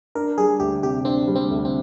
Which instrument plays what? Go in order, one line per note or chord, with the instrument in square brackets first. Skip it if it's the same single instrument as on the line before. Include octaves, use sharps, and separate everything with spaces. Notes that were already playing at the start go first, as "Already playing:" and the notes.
[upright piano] D4 [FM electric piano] A#4
[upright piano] G3 [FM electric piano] G#4
[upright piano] D2 [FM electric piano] G4
[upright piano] C3 [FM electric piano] G4
[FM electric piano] C4 [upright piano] D4
[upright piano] G3
[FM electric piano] C4
[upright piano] D2
[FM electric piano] C4